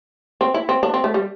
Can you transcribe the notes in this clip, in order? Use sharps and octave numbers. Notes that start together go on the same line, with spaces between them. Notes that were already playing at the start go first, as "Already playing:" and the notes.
C4
E4
C4
D4
C4
A3
G3